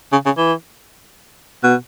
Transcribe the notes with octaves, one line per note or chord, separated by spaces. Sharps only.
C#3
C#3
E3
B2